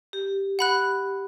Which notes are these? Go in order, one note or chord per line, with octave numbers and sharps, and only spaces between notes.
G4
F#5 B5 F#6